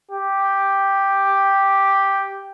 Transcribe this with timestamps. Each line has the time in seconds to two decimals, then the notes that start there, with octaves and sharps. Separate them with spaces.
0.12 G4